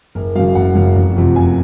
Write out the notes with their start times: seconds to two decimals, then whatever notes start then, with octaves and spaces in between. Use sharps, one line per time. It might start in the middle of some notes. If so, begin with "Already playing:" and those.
0.15 F#1 A#4
0.35 F#2 C#3 F#3 F5
0.55 F#1 F#5
0.75 F#2 C#3 F#3
0.96 F1
1.16 F2 C3 F3
1.36 F1 G#5